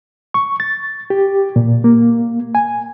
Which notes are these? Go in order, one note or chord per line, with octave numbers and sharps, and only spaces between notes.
C#6
A6
G4
A#2
A#3
G#5